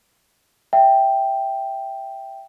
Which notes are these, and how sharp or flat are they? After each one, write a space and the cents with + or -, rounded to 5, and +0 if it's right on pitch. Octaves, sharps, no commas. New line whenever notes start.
E5 +0 G5 +0